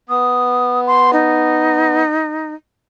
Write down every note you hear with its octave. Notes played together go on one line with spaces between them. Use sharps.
B3 D#6
C6
D#4